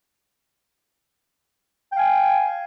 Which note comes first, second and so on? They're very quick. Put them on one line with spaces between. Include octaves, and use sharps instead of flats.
G5 F5 G#5